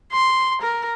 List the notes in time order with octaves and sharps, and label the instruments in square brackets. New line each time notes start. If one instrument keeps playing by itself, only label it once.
[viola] C6
A#4